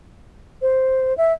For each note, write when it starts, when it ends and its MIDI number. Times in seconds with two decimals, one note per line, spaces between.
0.62 1.16 72
1.17 1.33 76